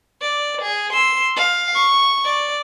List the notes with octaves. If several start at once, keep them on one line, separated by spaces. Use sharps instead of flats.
D5
G#4
C6 E6
F5
C#6
D5